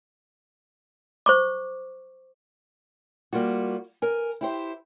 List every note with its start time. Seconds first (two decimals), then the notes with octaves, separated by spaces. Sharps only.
1.26 C5 C#6 D6
3.33 G3 A#3 F4 F#4
4.02 A#4 G#5
4.41 E4 G4 C5